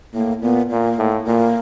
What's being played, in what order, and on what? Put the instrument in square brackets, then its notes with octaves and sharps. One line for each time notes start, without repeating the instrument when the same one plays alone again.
[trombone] A2 [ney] A#3
[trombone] A#2 [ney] B3
[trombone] A#2 [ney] A#3
[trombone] A2
[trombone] A#2 [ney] A#3